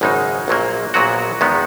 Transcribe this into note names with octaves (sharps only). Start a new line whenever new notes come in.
G#1 F#2 C#3 G#3 D#4
A#1 A#2 F#3 A#3
A#1 A#2 F#3 B3 F#4
E2 D#3 G#3 B3